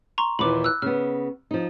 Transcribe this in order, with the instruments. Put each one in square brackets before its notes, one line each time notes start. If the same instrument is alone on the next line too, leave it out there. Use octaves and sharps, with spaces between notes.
[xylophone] A#5 C6 C#6
[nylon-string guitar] D#2 A#2 E3 [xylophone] B5 D6
[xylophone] E6 F#6
[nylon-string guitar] C#3 B3 [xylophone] F6
[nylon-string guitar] F3 D#4